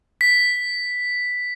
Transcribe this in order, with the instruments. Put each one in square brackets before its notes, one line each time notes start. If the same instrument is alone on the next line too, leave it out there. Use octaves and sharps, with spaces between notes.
[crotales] B6